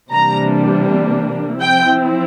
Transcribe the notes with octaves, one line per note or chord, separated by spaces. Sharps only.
C3 E3 G3 A#3 D4 A#5
F3 C4 E4 G5